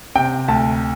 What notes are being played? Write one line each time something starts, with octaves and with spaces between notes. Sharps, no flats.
C3 G5
D2 A5